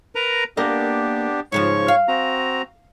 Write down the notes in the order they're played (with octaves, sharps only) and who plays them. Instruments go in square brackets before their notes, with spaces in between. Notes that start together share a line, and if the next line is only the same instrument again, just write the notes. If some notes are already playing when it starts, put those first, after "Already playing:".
[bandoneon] A#4 B4 A#5
[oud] A#3 A#4 D#5 [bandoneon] B3 D4 G4
[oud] G#2 C#3 F3 [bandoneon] C#5 C#6
[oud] F5
[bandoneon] C4 F#4 A#5